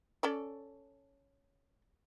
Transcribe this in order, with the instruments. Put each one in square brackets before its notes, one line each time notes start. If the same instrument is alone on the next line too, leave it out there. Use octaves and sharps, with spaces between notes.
[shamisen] C#4 A4 D5